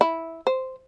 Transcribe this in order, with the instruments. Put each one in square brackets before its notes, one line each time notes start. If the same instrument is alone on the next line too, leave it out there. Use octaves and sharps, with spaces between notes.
[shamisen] E4
C5